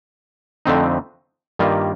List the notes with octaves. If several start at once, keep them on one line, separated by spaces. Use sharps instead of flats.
F2 D3 A3 C4 D#4
G2 D#3 G3 A#3 F4